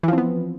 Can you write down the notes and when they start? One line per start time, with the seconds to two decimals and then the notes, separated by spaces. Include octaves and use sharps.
0.03 E3
0.08 F3
0.13 C4
0.18 B3